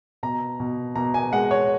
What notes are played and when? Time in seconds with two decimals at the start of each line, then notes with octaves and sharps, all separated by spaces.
0.23 B2 A#5
0.60 B2
0.96 B2 A#5
1.14 G#5
1.33 G#3 F#5
1.51 C#5